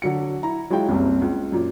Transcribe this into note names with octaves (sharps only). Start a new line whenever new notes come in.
D3 F#3 C#7
E4 A#5
F#3 G#3 E4 F4 G5
F#1 C2 C4
C#2
F#2 A#2